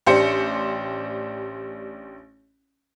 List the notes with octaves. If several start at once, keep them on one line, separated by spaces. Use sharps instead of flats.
A1 D4 G4 C5 C#7